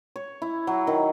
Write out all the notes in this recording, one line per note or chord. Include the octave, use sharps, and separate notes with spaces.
C#5
E4
F#3
D#3